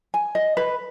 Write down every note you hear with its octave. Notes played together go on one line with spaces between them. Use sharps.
G#5
D#5
B4